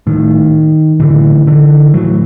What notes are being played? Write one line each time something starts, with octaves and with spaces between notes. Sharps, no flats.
A2 D#3
A2 D3 E3
D3 E3
A2 E3 F#3